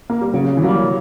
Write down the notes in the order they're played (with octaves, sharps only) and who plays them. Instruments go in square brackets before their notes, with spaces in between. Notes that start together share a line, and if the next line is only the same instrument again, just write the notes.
[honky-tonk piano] A#3
G3
[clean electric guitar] C#3 [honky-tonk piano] F#3
[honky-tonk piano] E3
[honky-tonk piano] F#3 [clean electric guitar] G3 A#3